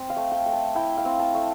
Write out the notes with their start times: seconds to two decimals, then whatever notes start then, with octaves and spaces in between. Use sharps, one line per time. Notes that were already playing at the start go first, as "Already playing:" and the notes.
Already playing: C4
0.10 F5
0.16 A3
0.32 G5
0.46 A3
0.53 A5
0.75 E4 G5
0.97 F5
1.05 C4
1.19 A5
1.34 A3